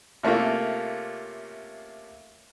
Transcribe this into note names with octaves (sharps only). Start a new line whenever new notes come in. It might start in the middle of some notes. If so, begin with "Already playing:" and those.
C3 A3 A#3 C#4 F4